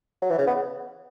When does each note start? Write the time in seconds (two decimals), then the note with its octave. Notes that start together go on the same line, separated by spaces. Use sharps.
0.22 F#3
0.30 E3
0.39 C#3
0.47 B3